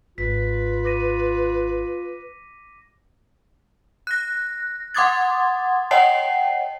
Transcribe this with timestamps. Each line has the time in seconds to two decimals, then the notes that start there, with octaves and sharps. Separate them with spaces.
0.18 G#1 F4 B4 B6
0.85 D6 A#6 D#7
4.07 F#6 A#6
4.94 F#5 C6 D6 D#6 G#6 A6
5.91 C#5 D#5 F#5 G5 A5 C7